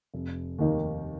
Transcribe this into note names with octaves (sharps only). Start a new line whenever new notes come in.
F1
D#2 D#3 A#3 D#4